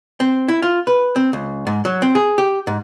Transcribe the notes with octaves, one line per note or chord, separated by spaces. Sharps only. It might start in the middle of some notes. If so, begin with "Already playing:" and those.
C4
E4
F4
B4
C4
C#2
G#2
F#3
C4
G#4
G4
G#2